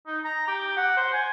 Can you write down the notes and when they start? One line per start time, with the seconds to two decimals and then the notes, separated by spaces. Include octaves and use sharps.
0.07 D#4
0.25 A#5
0.48 G4
0.77 F#5
0.97 C5
1.13 G#5